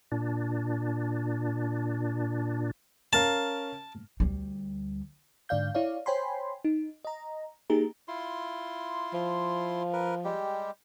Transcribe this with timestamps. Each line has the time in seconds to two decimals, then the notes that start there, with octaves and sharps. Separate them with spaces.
0.12 A#2 D4
3.13 C#4 A#4 F5 A5
4.20 D2 G3
5.49 G#2 D3 D5 F5 G6
5.75 E4 C#5 D5 F5
6.06 C5 C#5 G5 G#5 B5 C6
6.65 D#4
7.05 D#5 A#5
7.70 A#3 D#4 G4 G#4 A#5
8.08 E4 F4 C6
9.14 F3
9.93 A#4 B4
10.24 G3 G#3 G4